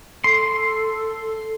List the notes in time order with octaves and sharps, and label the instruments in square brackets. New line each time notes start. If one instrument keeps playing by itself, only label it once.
[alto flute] A4 [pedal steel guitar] C6